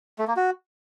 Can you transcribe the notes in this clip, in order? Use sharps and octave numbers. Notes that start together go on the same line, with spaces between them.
A3
A#3
F#4